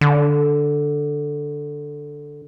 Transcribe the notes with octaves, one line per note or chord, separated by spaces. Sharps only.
D3